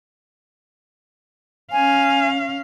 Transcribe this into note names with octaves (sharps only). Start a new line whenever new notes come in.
C#4 F5 G#5